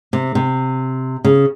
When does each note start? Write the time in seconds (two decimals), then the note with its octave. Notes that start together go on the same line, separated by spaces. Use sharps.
0.13 C3
0.35 C3
1.25 C#3